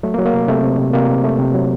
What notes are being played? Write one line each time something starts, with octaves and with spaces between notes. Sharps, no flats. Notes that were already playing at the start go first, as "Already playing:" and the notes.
F#3 A3
A#3
F#3
A#3
C3
C3 A3 C4
C3
C3
C3 A#3
C3
A3
C3
F#3